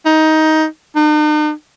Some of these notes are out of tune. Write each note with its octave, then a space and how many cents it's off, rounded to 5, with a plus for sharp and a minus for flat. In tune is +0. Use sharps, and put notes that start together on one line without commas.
D#4 +15
D#4 -45